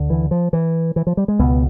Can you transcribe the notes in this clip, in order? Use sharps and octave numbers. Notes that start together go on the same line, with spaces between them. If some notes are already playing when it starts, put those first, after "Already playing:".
Already playing: D2 D3
E3
F3
E3
E3
F3
G3
G#3
C#2 B2 B3